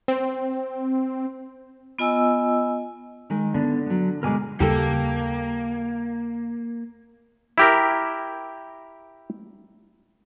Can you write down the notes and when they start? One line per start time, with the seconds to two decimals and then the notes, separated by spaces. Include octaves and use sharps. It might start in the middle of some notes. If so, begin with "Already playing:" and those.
0.08 C4
1.99 B3 F4 D#5 G#5 E6
3.30 D#3 G#3 A#4
3.54 D3 B3 D4
3.86 F#3 B3
4.23 B2 G#3 A#4 G#5 D6
4.60 D#2 C#3 G3 A#3 G4 A4
7.58 E4 G4 A#4